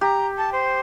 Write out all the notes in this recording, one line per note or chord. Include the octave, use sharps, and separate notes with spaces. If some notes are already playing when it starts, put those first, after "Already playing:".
G4 A#5
A5
C5